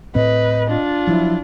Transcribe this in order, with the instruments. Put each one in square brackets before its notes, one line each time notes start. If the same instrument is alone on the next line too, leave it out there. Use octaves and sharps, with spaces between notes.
[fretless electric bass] A2 C4 [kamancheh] B4 [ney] D#5
[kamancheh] D4 F4
[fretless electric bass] F3 F#3 [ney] E4